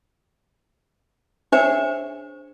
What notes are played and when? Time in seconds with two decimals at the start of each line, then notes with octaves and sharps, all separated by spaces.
1.52 D4 G#4 C5 C#5 E5